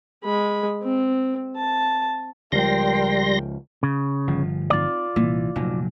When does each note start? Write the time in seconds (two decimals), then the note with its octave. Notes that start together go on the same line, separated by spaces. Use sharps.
0.24 G#3 B5
0.83 C4
1.57 A5
2.52 C#2 F3 G3 A#4 G5 C6 A#6
3.83 C#3
4.28 G1 F3
4.70 C4 D#4 F4 D5
5.16 C2 A#2 E3
5.56 F1 A#2 F#3 D#4